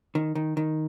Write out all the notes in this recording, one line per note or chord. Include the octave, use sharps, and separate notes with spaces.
D#3
D#3
D#3